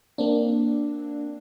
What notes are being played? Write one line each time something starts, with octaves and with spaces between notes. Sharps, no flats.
A#3 C4 D4